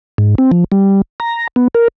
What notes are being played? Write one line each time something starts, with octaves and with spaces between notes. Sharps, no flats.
G#2
C4
F3
G3
A#5
B3
A#4